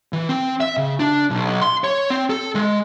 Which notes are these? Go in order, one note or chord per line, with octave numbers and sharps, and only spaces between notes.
E3
C4
E5
C#3
D4
B1
C6
C#5
C4
A4
G#3